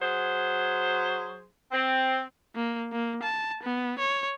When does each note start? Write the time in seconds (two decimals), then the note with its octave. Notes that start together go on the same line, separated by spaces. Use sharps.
0.01 F#3 G#4 C5
1.72 C4
2.56 A#3
2.92 A#3
3.23 A5
3.63 B3
3.99 C#5